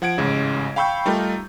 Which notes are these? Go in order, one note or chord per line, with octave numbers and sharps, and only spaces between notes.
F3 F#5 G#6 D7
A1 G#2 C#3 G#3
F5 G5 B5 C#6 E6 G6
G3 A3 D#4 F4 A#4